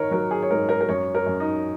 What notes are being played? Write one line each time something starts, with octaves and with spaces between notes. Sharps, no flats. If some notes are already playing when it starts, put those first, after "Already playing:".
Already playing: D#3 A#4 C#5
F#3 A#4
G#4
C#5
G#2 A#4
A#4
A#4
F#2 C#5
A#4
F#2
D#4